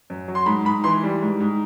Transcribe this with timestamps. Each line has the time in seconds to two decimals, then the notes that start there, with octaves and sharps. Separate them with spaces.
0.10 F#2
0.28 F#3
0.35 C6
0.46 G#2 B5
0.65 G#2 B5
0.84 E3 C6
1.03 G3
1.22 G#2
1.40 G#2